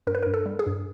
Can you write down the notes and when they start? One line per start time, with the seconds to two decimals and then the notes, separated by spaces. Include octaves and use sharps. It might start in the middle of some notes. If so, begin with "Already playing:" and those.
0.07 G2 A#4
0.15 B4
0.23 A#4
0.26 G2
0.34 A4
0.46 G3
0.59 G#4
0.67 G2